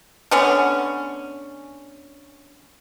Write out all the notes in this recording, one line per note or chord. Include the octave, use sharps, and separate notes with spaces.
D3 B3 C#4